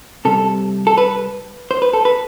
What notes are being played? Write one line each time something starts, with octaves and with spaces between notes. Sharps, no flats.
C3 G3 A4
A4
B4
C5
B4
A4
B4